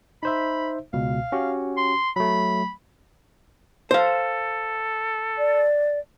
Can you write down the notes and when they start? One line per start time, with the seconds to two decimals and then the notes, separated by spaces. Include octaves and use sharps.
0.23 D#4 C5 E5 B5
0.93 C#2 B2 F5
1.32 C#4 F#4 G4
1.77 C6
2.16 F#3 A3 B5
3.91 A4 C5 F5
5.38 D5